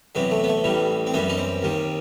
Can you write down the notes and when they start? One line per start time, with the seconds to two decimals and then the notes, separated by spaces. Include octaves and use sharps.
0.15 E2 C3 F#3 B3
0.31 A3
0.44 B3
0.49 A3
0.64 A1 A2 E3 G3
1.07 C4
1.14 F#2 E3 G3 B3
1.29 D#4
1.38 C4
1.62 D#2 D#3 G3